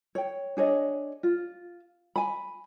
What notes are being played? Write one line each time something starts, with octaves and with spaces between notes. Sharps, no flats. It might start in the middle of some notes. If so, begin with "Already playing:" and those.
C#5 G5
D4 G#4 C#5 D#5
F4
G#5 B5